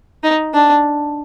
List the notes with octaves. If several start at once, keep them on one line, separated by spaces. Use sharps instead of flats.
D#4
D4